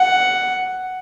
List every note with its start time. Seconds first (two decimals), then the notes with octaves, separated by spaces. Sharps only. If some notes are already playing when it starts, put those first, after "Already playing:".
Already playing: F#5